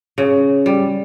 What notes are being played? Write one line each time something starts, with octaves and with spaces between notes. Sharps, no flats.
C#3
G3